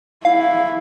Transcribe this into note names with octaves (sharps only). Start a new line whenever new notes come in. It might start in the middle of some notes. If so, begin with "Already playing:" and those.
E4 F5